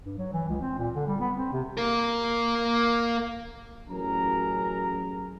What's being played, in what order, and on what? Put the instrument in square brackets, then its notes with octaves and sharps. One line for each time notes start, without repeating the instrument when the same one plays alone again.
[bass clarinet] G2
F#3
E3
C#2
C4
A#2
D3
G3
B3
C4
C3
[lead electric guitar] A#3 A#4
[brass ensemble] A1 F#3 C#4 G#4 A#4 A#5